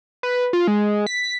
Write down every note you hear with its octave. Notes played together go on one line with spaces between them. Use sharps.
B4
F4
G#3
B6